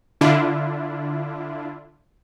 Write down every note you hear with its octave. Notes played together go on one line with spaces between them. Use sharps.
D3 D4 E4 F4